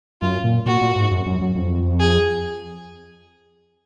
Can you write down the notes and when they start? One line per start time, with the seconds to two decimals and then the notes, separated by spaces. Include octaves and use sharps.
0.22 F#2 F4
0.44 A#2
0.66 A#2 F#4
0.81 A#2
0.96 G#2
1.11 F#2
1.26 F#2
1.42 F#2
1.56 F2
2.00 G#4